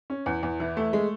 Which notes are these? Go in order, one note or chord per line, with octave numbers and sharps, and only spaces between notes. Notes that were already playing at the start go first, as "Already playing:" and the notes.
C#4
E2
E2
E3
A3
G#3